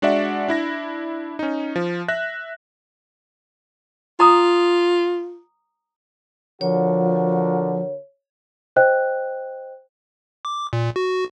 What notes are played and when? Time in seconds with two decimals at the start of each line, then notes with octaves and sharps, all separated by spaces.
0.02 G#3 D4 F#4 D5 E5 F#5
0.48 D4 E4 A#6
1.39 C#4 D#4
1.76 F3
2.08 E5 F#6 A#6
4.20 F4 A#5 D#6
6.61 D3 F3 F#4 A#4 C#5
8.76 C5 D#5 G5 F#6
10.45 D6
10.73 A#2
10.96 F#4